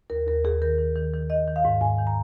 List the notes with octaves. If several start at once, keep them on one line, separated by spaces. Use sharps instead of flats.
D#2 A#4
D#2 A#4
D#2 G#4
D#3 A#4
D#3
D#3
D#3
D#3 D#5
D#3
F5
G#2
G#2 G#5
D#3
A#5